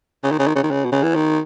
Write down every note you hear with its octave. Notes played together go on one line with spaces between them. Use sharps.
C#3
D#3
C#3
D#3
C#3
D#3
C#3
B2
C#3
E3
D#3